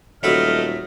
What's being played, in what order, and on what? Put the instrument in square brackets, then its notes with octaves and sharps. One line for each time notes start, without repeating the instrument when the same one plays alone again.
[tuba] D#1 [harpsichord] F#3 A4 B5 [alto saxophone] A3 [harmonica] D#5 F6